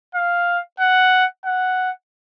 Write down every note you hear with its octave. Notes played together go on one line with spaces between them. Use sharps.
F5
F#5
F#5